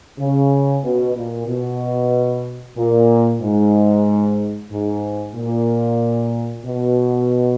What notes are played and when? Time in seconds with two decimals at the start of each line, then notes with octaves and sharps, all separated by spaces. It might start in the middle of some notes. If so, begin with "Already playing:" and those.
0.19 C#3
0.83 B2
1.16 A#2
1.47 B2
2.77 A#2
3.41 G#2
4.72 G#2
5.35 A#2
6.66 B2